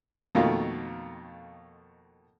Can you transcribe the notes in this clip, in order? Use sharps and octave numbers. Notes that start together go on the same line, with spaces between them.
F2 B2 D#3 A3 A#3 F4